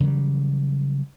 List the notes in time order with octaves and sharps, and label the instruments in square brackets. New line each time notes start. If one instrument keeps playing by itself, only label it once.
[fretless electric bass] C#3 E3 F#3 G3